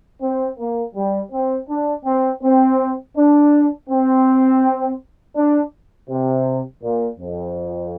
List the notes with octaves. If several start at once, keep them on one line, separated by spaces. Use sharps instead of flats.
C4
A#3
G3
C4
D4
C4
C4
D4
C4
D4
C3
A#2
F2